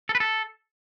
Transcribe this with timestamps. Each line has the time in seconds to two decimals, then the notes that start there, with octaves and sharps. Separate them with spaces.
0.09 A4
0.15 B4
0.20 A4